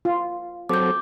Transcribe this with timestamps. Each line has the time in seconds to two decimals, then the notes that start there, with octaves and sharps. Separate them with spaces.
0.05 F4
0.69 F#3 C4 A4 D6 G6